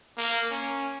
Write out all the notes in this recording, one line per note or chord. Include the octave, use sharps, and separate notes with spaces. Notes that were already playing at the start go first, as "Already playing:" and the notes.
A#3
C#4